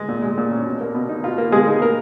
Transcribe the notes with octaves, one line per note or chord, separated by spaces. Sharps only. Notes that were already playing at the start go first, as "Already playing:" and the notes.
Already playing: G#3
A#2
G#3
A#2
C#4
B2
A#3
B2
D#4
B2 F4
A#3
B2 G#3 G#4
D#4
A#3 A#4